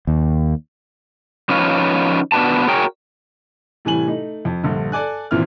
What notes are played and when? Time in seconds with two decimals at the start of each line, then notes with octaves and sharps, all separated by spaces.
0.07 D#2
1.50 F3 C#4 D#4 B4 C#5 F5
2.32 B3 D4 F#4 B4 A5
2.67 F#4 G#4 A#4 C#5 G5
3.85 A2 C3 E3 G3 G#5 F#7
4.07 A3 D#4
4.45 F2
4.64 A#1 G2 D3
4.92 A4 D5 G#5 F#6
5.31 G#1 A#2 E3 C4 E5 F6